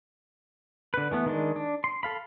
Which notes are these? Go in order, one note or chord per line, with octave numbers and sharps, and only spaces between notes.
D3 B4
E3 A3 B3
D#3 G#3 D4
D4
C6
A4 F5 B5